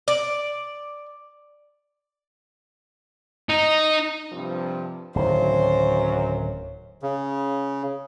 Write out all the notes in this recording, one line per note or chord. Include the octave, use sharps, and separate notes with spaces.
D5
D#4
G2 C3 F3
D1 F#2 D#3 C5 C#5
C#3